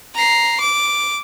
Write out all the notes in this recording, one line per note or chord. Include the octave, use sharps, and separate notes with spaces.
A#5 C7
D6